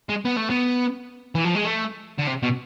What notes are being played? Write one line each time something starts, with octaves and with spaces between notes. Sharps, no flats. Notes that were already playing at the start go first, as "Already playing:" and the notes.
G#3
B3
A3
B3
E3
F3
G#3
A3
D3
C3
B2